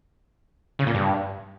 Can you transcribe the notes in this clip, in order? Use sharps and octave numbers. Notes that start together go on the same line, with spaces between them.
C#3
A#2
G2